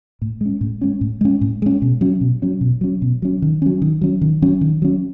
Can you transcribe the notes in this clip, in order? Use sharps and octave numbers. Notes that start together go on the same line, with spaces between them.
A2
G#3 C#4
A2
G#3 C#4
A2
G#3 C#4
A2
G#3 C#4
B2
F#3 C#4
B2
F#3 C#4
B2
F#3 C#4
B2
F#3 C#4
D#3
F#3 C#4
D#3
F#3 C#4
D#3
F#3 C#4
D#3
F#3 C#4